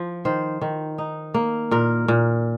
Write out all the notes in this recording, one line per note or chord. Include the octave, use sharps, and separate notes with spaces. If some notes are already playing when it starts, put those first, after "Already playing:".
Already playing: F3
D#3 C5
D#3
D#4
A#3
A#2 A#4
A#2